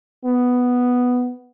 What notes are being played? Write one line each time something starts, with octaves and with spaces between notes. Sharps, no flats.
B3